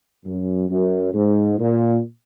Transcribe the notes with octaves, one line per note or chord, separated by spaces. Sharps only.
F#2
F#2
G#2
A#2